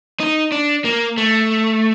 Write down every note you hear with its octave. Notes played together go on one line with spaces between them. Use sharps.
D#4
D4
A#3
A3